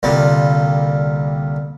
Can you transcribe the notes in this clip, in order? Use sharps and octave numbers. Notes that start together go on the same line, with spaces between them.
C2 A#2 D3 G3 F4